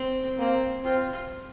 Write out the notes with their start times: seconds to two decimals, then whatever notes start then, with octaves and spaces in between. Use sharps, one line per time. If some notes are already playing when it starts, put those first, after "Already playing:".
Already playing: C4
0.39 A#3 C4
0.84 C4 F4